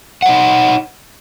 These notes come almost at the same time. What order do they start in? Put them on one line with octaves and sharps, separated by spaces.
F#5 C#5 D#4